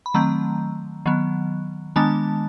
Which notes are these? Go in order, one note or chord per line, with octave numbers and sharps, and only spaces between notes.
B5
D#3 F#3 A3 C4 A#5
D#3 F#3 B3
D#3 G#3 B3 D4 A5